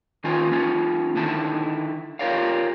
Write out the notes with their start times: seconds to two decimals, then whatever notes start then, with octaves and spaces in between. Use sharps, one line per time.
0.24 D#3 C#4 F4 G#5
0.51 A#3 C#4 F4
1.16 D3 D#3 E4 A5
2.19 F4 G4 A#4 C#5 D5 F5